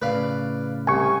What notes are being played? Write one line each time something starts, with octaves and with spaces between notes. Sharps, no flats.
A2 C#3 B4 D5 F5
C2 G#5 C#6